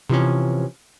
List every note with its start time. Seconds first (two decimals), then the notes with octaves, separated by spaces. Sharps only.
0.10 C3 E3 F3 C#4